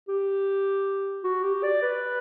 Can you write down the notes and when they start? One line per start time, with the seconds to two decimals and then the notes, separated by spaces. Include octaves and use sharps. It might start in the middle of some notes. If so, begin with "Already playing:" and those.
0.08 G4
1.24 F#4
1.44 G4
1.63 D5
1.82 B4